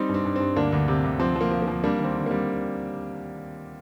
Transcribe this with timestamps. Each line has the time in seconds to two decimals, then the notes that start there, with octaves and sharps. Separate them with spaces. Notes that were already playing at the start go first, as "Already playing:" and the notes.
Already playing: G3 C4 D#4
0.09 G2
0.14 C4
0.25 G2
0.36 G2 C4
0.56 D2 A#3 D4
0.72 D2
0.88 C3
1.04 D2
1.20 F3 C4
1.36 F3 A#3
1.51 F3
1.62 A#3
1.68 F3
1.84 G3 A#3 D4
1.99 D#2
2.04 C4
2.15 D3
2.26 G3 A#3